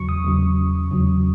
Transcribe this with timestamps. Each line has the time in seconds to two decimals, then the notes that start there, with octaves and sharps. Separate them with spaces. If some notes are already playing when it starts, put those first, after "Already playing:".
Already playing: E2 C#3 F#3 C#6
0.09 D#6
0.24 E2 C#3 F#3
0.91 E2 C#3 F#3